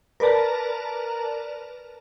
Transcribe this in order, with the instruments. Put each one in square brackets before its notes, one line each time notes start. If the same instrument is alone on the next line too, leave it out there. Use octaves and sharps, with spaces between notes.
[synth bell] A#4 B4 D5 A5 A#5